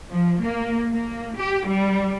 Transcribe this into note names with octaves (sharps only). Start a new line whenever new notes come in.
F3
A#3
A#3
G4
G3